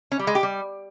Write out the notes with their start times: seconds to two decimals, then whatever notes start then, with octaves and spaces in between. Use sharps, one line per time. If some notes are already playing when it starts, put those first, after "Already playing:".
0.12 C#4
0.19 G3
0.27 G#3
0.35 G4
0.43 G3